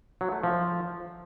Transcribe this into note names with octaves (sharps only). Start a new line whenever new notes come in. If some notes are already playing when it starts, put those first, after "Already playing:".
F#3
A3
F3